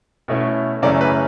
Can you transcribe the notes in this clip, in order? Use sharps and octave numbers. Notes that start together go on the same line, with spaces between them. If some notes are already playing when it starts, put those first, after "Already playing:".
B2 A3 C#4 E4
F#2 C#3 E3 A3 C#4 D5
B4